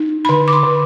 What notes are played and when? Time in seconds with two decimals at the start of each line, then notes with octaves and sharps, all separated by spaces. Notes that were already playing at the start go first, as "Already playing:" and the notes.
Already playing: D#4
0.25 B5
0.29 D3 C6
0.48 D6
0.53 C6
0.64 D3